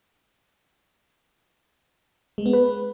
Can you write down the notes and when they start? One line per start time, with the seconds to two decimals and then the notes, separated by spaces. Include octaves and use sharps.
2.38 G#3
2.46 B3
2.53 B4